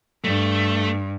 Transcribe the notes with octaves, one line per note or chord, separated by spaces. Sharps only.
G2 A3